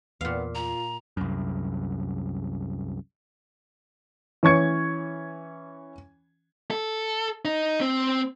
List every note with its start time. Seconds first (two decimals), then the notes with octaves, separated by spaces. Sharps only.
0.21 E2 A#2 B3 F5
0.55 F4 A#5
1.17 C2 F#2
4.43 E3 C#4 C#6 G#6 C#7
6.71 A4
7.45 D#4
7.81 C4